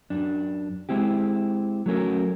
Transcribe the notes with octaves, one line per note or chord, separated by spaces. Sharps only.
F#2 D4
G#3 C4 E4 G4
F#3 A3 C#4 A#4